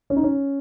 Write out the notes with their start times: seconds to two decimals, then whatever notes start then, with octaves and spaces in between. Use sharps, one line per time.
0.10 C#4
0.16 D#4
0.24 C#4